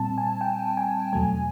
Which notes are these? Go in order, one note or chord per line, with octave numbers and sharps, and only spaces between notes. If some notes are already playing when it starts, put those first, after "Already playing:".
Already playing: A#2 G3 C4 A5
G#5
G5
G#5
E2 B2 F#3 A3 G#5